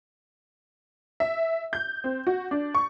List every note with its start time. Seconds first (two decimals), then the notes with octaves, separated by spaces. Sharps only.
1.20 E5
1.73 G6
2.04 C4
2.27 F#4
2.51 D4
2.75 C#6